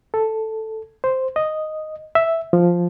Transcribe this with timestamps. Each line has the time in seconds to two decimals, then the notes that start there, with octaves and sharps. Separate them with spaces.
0.14 A4
1.04 C5
1.36 D#5
2.15 E5
2.53 F3